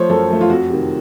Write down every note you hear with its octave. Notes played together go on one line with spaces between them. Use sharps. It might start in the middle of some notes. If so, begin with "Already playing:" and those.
Already playing: F3 A3 C5 C#5
F#2 A4
F3 A3
F4
F2 F#4
C3 D#3